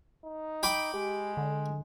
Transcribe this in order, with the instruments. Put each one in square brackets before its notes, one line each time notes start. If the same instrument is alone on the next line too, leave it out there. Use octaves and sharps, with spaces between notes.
[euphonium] D#4
[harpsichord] G5 B5 D6
[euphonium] G#3 [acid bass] G4
[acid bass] D3